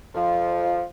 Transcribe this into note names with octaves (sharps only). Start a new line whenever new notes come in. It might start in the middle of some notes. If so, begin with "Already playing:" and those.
F2 F3